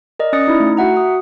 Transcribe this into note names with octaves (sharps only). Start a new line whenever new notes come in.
A#4 D5 D#5
C#4 D5 D#6 A6 C#7
D#4 E4
A3
F#4 E5 F#5 A#5
D#6